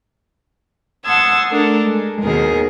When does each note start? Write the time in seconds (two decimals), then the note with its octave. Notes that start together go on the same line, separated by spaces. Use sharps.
1.04 F#5 A5 C6 D#6 E6 G#6
1.48 A3 D4 A4 A#4
1.84 G#3
2.21 D#2 B2 D#3 G#4 A#4